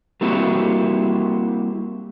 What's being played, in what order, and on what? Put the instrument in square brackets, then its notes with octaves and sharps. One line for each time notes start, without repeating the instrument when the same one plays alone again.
[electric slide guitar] G3 A#3 C4 E4 F#4 G4